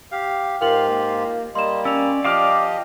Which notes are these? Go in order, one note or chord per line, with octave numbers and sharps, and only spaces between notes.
G4 F5
G#2 F4 G4 A#4 F5 G5 F#7
A#3
G3 A#3 D#5 C6 E7
C#4 D5 E6 F7
F3 G4 D#5 F5 D6 F6